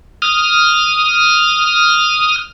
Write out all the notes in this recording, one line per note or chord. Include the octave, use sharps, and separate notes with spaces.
D#6 F6